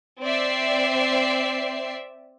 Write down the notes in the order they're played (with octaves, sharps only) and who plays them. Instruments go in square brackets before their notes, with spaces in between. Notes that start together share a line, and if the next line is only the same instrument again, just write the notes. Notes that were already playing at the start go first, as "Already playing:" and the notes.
[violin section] C4 D5 E5 C7